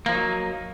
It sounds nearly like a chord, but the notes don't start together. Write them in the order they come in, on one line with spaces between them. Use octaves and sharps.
A#3 F3 D#4 F#3